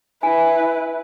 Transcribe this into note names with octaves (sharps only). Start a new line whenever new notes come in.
E4 B4 G#5